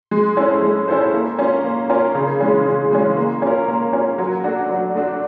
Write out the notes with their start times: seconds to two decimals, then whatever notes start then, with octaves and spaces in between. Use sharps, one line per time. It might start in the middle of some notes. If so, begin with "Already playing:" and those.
0.11 G#3
0.37 C#4 E4 A4 C5
0.62 G#3
0.88 C#4 E4 A4 C5
1.13 A#3
1.39 C#4 F4 A#4
1.64 A#3
1.89 C#4 F4 A#4
2.15 C#3
2.40 E3 G#3 C#4
2.66 C#3
2.91 E3 G#3 C#4
3.17 A#3
3.42 C#4 F4 A#4
3.68 A#3
3.93 C#4 F4 A#4
4.18 F#3
4.44 A3 D4 F#4
4.69 F#3
4.95 A3 D4 F#4